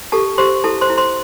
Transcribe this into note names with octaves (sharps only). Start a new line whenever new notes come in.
G4 A4 A5
G4 C5 C6
E4 A4 A5
C5 C6
E4
C5 C6